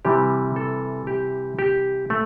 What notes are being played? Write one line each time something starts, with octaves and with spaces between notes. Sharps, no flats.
C3 E3 G3 G4
A4
G4
G4
A3